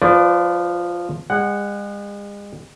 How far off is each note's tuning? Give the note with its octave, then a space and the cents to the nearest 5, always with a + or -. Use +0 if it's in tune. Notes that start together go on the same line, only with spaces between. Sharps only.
F3 +0 B4 +35 D5 -10
G#3 -40 F#5 +0